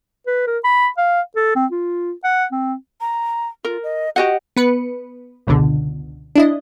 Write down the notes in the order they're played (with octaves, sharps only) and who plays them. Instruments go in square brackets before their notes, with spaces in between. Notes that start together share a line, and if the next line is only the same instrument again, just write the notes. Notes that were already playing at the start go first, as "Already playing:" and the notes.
[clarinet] B4
A#4
B5
F5
A4
C4
F4
F#5
C4
[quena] A#5
[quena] F4 [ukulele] A#4
[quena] D#5
[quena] F#4 [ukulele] G4 D#5 F#5
[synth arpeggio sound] B3 B4 C#7
G1 C#2 B2 D3
D4 E4 D#5